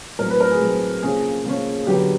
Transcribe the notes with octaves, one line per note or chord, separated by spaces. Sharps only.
A2 F#3 A3 C4 A#4
B4
A#4
G#4
A2 F#3 A3 C4
C#3 F3 A#3 C#4 G#4
C#3 F3 A#3 C#4
D3 F#3 B3 G4